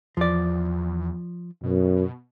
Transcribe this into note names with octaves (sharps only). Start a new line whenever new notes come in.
E2 F3 D5
F#2 B2